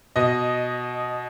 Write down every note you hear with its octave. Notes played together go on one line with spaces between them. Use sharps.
B2 D#5